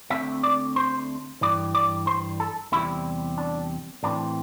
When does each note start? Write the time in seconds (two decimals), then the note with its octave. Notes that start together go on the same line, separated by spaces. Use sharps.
0.10 D2 D3 A3 C4 E5
0.43 D5
0.76 C5
1.41 G2 E3 G3 D5
1.75 D5
2.07 C5
2.40 A4
2.72 E2 C3 G3 C4 E4
3.38 D4
4.03 A2 E3 C4 D4